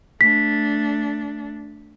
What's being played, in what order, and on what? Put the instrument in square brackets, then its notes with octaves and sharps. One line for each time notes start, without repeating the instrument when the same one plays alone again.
[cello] A3 D4 [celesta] B6